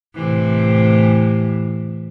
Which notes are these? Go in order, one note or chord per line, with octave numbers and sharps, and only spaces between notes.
A2 C3 E3